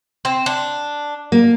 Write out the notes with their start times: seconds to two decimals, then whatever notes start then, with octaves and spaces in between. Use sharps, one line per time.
0.25 C4
0.46 D4
1.32 A#3